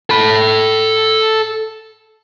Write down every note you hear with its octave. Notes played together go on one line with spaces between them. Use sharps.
A4 B5